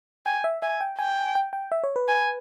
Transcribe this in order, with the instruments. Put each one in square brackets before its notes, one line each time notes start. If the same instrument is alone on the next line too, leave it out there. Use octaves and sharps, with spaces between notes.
[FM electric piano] G5 [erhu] G#5
[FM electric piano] E5
[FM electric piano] E5 [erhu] G#5
[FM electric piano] G5
[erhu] G5 [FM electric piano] G#5
[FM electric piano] G5
G5
E5
C#5
B4
[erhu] G#5